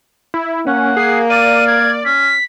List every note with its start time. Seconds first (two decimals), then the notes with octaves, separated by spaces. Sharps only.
0.34 E4
0.67 A#3 C#4 F#5
0.97 G#4 C7
1.30 D5 F5 D#7
1.67 G#6
2.05 C#4 B6